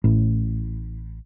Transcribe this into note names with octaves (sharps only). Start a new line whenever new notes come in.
A1 A2